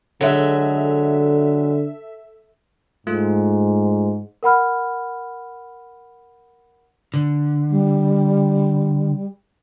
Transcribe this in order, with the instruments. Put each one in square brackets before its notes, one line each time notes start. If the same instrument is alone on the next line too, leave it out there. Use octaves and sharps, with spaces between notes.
[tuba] D3 [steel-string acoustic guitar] F#3 G#3 [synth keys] A4 E5
[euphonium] G#2 [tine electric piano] A3 F4
[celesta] A#4 F#5 B5 F6
[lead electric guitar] D3
[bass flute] G3